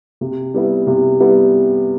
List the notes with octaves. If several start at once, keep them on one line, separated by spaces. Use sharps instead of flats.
C3
G3 B3 E4
C3
G3 B3 E4